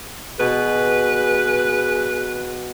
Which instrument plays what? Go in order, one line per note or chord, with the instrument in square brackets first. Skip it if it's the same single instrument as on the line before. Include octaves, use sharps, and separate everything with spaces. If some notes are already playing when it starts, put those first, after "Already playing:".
[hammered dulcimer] B2 [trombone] G#4 [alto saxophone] B4